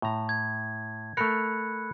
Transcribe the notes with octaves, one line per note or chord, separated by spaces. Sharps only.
A2 A#5
G#6
A3 A4 A#4 B5 F#6 C#7